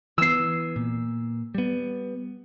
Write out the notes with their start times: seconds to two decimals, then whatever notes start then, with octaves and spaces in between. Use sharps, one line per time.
0.18 E3 B3 E6 C7
0.76 A#2
1.55 G3 B3